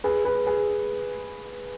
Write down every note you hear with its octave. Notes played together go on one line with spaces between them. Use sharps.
G#4 B4
G#4 B4
G#4 B4